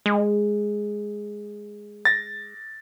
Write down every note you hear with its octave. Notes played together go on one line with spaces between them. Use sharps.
G#3
A6 A#6